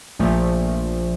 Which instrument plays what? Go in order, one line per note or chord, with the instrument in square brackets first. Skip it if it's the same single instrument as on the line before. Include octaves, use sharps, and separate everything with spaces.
[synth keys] A#1 A#2 F3 A3